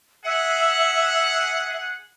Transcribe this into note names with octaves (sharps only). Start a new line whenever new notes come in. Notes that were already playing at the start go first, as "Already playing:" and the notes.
G#4 E5 F#5